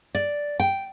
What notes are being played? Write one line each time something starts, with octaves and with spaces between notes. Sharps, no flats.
D5
G5